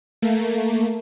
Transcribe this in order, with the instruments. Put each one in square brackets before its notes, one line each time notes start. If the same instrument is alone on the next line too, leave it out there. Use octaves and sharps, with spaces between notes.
[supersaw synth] A3 A#3